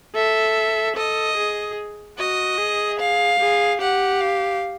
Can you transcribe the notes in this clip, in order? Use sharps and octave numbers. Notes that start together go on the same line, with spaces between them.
A4 E5
A4 D#5
G#4
F#4 D#5
G#4
F5
G#4
G4 F#5
F5